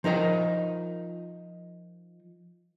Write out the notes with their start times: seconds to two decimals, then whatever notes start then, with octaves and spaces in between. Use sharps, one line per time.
0.04 F3 D#4 A#4 D#5